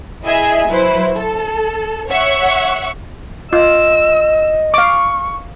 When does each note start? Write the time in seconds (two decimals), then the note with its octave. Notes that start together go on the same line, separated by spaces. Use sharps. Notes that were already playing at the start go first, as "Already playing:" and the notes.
0.24 E4 G#4 D#5 E5 G#5
0.69 F#3 E4 B4 C5
1.15 A4
2.08 C#5 E5 F#5 C#6
3.53 F4 D#5 E6
4.74 F5 C#6 D6